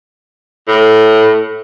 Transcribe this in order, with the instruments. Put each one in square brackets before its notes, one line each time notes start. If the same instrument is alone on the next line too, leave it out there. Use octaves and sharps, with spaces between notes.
[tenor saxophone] A2